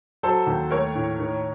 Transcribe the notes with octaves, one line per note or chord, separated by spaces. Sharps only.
F#3 A4 C5
D#2
A3 A#4 C#5
A2
D#3